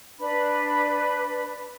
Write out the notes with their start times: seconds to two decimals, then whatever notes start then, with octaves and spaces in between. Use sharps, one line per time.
0.20 D4 B4 B5